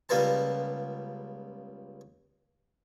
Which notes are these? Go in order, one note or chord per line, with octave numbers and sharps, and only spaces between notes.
C#2 G3 A#3 B3 A5